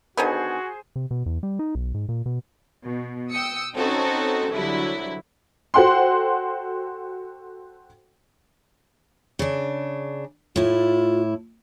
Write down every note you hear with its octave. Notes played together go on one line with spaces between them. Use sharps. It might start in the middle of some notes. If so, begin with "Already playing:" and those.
D3 D#3 B3 F#4 G#4 C5 G#5
C3
B2
E2
G3
D#4
B1
G#2
A#2
B2
B2
G5 D#6 E6 C#7
C4 C#4 D#4 F#4 A4
C2 D3 F#3 E4
F#4 A4 C5 F#5 G5 C6
C#3 D4
A2 E4 F4